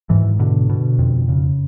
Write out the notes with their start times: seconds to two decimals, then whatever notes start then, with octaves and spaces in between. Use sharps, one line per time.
0.10 G#2 E3
0.39 B2 D3
0.69 B2
0.99 F2
1.29 C#3